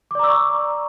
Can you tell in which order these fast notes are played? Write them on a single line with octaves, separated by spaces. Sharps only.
D6 D5 A#5 E6 C#6